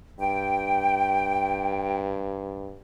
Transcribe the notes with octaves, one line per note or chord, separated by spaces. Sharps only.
G2 G5